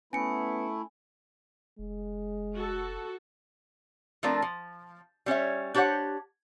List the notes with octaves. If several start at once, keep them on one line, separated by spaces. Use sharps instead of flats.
A3 B3 C#4 E4 G#5 C#7
F1 G#3
F#4 A4
F3 A3 C4 D4 F4 A#4
F3
G3 C#4 C#5 E5
D4 G4 C5 C#5 F#5